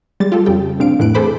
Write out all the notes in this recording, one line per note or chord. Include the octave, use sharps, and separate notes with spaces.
G3 G#3 A6
F4 G4 A4
F2 C#3 G3 G5
A1 C3 C4 D4 F5 D7
F2 A2 E3 F#6 D7
G#4 A4 B4 C5 B5 D6